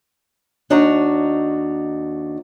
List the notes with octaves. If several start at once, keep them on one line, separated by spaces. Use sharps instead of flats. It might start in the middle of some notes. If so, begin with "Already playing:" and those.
D#2 D4 D#4 F#4 A#5